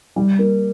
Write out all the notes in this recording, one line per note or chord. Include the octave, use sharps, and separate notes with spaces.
G3
A#3